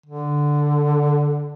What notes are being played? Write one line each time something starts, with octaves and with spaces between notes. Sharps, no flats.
D3